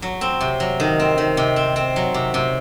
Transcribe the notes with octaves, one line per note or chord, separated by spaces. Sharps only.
F#3
C4
C3
F#3
D#3
C4
D#3
C3
C4
C4
F#3
C3
C3